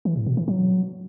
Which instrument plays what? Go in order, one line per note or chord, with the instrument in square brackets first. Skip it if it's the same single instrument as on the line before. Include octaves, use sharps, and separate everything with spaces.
[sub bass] E3
A2
B2
E3
F#3